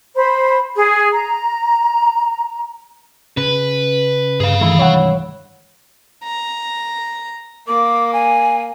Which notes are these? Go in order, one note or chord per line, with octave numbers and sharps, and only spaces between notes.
C5 B5
G#4
A#5
C#3 B4
G2 G#4 F5
D#3 E3 G#3 A3 E4
C2 G2 E4 C#5 F#5
A#5
A#3 D6
G#5